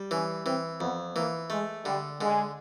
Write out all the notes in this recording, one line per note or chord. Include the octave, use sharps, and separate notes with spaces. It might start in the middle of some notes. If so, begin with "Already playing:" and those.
Already playing: G3
E3 C#4
E3 C4
F2 B3
E3 A#3
G#3 A3
D3 G3
D3 G#3